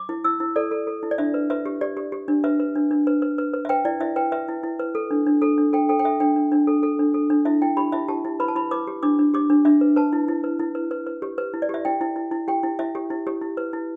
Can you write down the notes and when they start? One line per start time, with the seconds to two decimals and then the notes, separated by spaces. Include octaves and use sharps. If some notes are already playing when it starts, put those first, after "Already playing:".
Already playing: D6
0.09 E4
0.24 E4 E6
0.40 E4
0.56 A4 D5
0.71 A4
0.87 A4
1.03 E4
1.11 D5
1.18 D4 E5
1.34 B4
1.50 B4 E5
1.66 G4
1.81 G4 D5
1.97 G4
2.12 G4
2.28 D4
2.44 B4 E5
2.60 B4
2.75 D4
2.91 D4
3.07 B4
3.22 B4
3.38 B4
3.54 B4
3.65 E5
3.69 B4 G5
3.85 E4 D5
4.00 E4 E5
4.16 B4 G5
4.32 B4 E5
4.48 E4
4.63 E4
4.79 B4
4.95 A4
5.11 D4
5.26 D4
5.42 A4
5.58 D4
5.73 A4 G5
5.89 A4 G5
5.99 G5
6.04 A4 E5
6.20 D4 G5
6.36 D4
6.52 D4
6.67 A4
6.83 A4
6.99 D4
7.14 A4
7.30 D4
7.45 E4 E5
7.62 E4 G5
7.77 G4 B5
7.92 E4 E5
8.08 G4 A5
8.25 E4
8.40 B4 B5
8.48 A5
8.56 E4 B5
8.71 B4 D6
8.87 G4
9.03 D4 D6
9.19 D4
9.34 G4 D6
9.50 D4
9.65 D4 E5
9.81 B4
9.96 B4 A5
10.13 E4
10.28 E4
10.44 B4
10.59 E4
10.75 B4
10.91 B4
11.07 B4
11.22 G4
11.38 B4
11.54 E4
11.62 D5
11.69 G4 E5
11.85 E4 G5
12.01 E4
12.16 E4
12.31 E4
12.48 G4 G5
12.63 E4
12.79 E4 E5
12.95 G4
13.10 E4
13.27 G4
13.41 E4
13.57 B4
13.73 E4